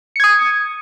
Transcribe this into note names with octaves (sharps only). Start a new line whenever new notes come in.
D#6 G#6 C#7